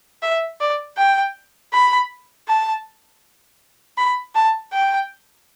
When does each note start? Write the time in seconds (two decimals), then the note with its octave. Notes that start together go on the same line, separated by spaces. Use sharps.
0.22 E5
0.60 D5
0.97 G5
1.73 B5
2.48 A5
3.98 B5
4.35 A5
4.73 G5